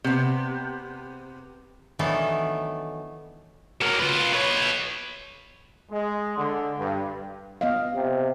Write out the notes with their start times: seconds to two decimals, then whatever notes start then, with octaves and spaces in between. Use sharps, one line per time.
0.04 C3 B3
1.99 D#3 E3 F#3 A3 B3 D4
3.81 F#3 A#3
4.00 F4 B4
4.34 B4 C#5
5.91 G#3
6.38 D3
6.78 G2
7.61 B3 D#5 F5
7.95 C3